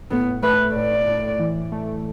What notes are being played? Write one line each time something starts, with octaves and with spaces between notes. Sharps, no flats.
A2 B3
A3 B4
A2 D5
A2
E3
A3